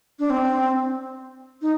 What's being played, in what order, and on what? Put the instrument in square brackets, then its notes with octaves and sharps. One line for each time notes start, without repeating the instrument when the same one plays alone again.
[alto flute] D4
C4
D#4